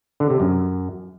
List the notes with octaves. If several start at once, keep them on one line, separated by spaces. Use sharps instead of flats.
D3
C3
F#2